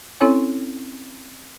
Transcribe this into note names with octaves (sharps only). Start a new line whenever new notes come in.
C4 C#4 E4 A4 C#5 G#5